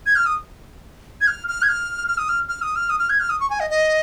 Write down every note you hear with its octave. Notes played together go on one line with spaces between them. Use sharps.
G#6
F6
D#6
G#6
F6
F6
G#6
F6
F6
D#6
F6
F6
D#6
F6
D#6
F6
G#6
F6
D#6
C#6
G#5
D#5
D#5